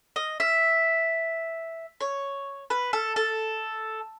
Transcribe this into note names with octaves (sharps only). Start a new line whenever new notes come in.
D#5
E5
C#5
B4
A4
A4